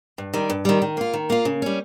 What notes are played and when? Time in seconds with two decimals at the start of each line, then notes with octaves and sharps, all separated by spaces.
0.18 G2
0.34 D#3 G3
0.50 G2
0.65 D#3 G3
0.82 D#3
0.97 A#3 F4
1.14 D#3
1.30 A#3 F4
1.45 C#3
1.62 G3 C#4